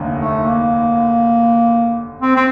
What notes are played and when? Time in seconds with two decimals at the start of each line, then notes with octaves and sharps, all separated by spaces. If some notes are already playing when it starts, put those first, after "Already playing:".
Already playing: F1 D#2 D3
0.16 A3
0.45 A#3
2.22 C4
2.36 C4